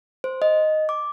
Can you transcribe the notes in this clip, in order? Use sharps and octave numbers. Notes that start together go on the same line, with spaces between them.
C5
D#5
D6